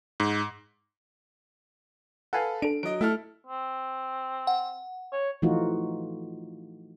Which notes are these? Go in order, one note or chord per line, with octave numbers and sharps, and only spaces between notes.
G#2
A4 B4 F5 F#5 G#5
D4 A4 D7
F#3 D#5 D7
A3 E4 A4 F6
C4
F#5
C#5
E3 F3 A3 D#4 F4 F#4